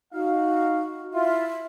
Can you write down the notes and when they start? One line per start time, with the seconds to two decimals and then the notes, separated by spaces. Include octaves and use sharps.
0.14 D#4 F#4 F5
1.14 E4 F4 E5